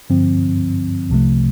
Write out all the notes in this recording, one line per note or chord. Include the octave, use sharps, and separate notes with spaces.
G2 D3 F3 C4
C2 C3 F3 A3